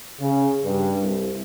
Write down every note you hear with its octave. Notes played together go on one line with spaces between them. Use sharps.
C#3
G2
C2